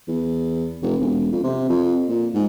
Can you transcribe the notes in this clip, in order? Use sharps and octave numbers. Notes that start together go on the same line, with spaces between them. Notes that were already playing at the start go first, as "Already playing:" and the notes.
E2
F1
E1
F2
C3
F2
A#2
G#2